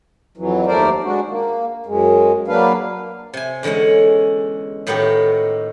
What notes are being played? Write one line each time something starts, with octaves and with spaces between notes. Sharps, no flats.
F2 E3 F#3
D#2 A3 A#4 C5 D5
G#3 D4 F#4
A#3
F#2 G#3
F#3 A#3 D4 B4 F5
C3 G#5
E2 D3 G#3 C#4 F#5
A2 D#3 B3 D#4 F#4 G4